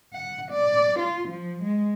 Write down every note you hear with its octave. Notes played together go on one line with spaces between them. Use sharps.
F#5
D5
F4
F3
G#3